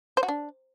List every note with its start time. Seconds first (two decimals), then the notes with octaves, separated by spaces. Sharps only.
0.17 C5
0.23 F#4
0.28 D4